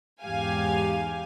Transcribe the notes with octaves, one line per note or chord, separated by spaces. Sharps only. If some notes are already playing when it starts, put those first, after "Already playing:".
E2 G#2 G4 F5 G#5